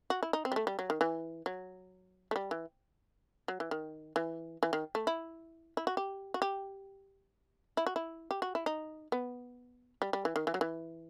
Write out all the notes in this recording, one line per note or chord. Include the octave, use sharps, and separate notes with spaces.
F#4
E4
D#4
C4
G3
A3
G3
F#3
D#3
E3
F#3
A3
G3
E3
F#3
E3
D#3
E3
E3
D#3
A3
E4
E4
F#4
G4
F#4
G4
E4
F#4
E4
G4
F#4
E4
D#4
B3
G3
G3
E3
D#3
E3
F#3
E3